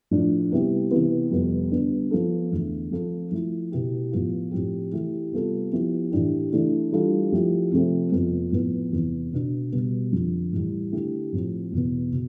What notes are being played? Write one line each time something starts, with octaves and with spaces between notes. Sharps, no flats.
A2 F3 A3 D4
C3 G3 B3 E4 G4
C3 E3 B3
F2 C3 G3 B3
D3 G3 B3 D4
F3 B3 F4 A4
E2 D3 A3
F3 C4 F4 A4
F3 A3 E4
B2 B3 E4 G4
A2 F3 B3 F4
A2 F3 C4 G4
E3 A3 E4 G4
C3 G3 B3 F4 A4
F3 B3 E4 G4
A2 E3 A3 D4 G4
E3 A3 D4
E3 G3 D4 F4 A4
F3 A3 E4 G4
C3 F3 A3 C4
F2 C3 F3 B3
A2 F3 B3
E2 C3 E3 B3
B2 B3 D4
B2 G3 B3
F2 D3 F3
A2 E3 G3
D3 A3 E4 G4
A2 F3 C4
E2 B2 B3
B2